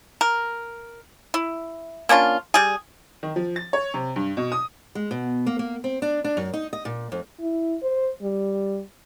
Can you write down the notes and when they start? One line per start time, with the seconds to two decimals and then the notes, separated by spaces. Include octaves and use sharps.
0.21 A#4
1.34 E4
2.09 A#3 C#4 D4 F4
2.54 G3 G#4
3.23 D#3
3.36 F3
3.56 A6
3.73 C#5
3.94 C3
4.16 G2
4.37 B2
4.52 D#6
4.95 G#3
5.11 B2
5.46 A#3
5.59 A#3
5.84 C4
6.02 D4
6.24 D4
6.37 F#2
6.53 D#4
6.73 D#5
6.85 A#2
7.12 F2
7.40 E4
7.83 C5
8.22 G3